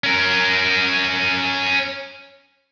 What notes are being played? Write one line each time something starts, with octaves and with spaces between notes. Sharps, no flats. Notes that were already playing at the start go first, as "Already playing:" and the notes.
C#4 A#4